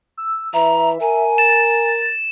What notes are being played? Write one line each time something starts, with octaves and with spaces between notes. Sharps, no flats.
E6
E3 E5 A#5
A#4 G#5
A6 E7